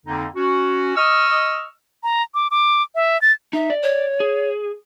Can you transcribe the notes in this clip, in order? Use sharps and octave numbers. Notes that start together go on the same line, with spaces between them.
F2 D3 A#3 D#4
C#4 F#4
D#5 C#6 E6 F6
A#5
D6
D6
E5
A6
D#4 E5
D5
C#5
G#4